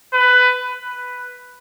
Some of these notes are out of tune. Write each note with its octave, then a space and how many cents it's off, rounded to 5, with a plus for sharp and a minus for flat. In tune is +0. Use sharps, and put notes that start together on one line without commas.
B4 +15
B4 +5